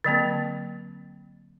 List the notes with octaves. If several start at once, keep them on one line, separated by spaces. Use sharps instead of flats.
D3 F#3 A#3 C4